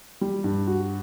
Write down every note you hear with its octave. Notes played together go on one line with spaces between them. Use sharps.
G3
G2
F#4